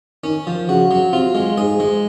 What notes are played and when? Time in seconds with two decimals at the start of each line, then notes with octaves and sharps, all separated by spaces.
0.24 D#3 C#4
0.47 F3
0.69 C#3 F#4
0.91 F#3
1.13 C3 F4
1.35 G#3
1.58 G#2 G#4
1.80 G#3